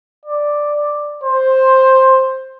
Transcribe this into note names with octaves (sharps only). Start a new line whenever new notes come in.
D5
C5